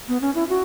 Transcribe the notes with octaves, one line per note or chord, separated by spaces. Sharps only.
B3
C#4
E4
F#4